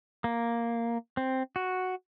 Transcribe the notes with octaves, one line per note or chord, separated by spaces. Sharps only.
A#3
C4
F#4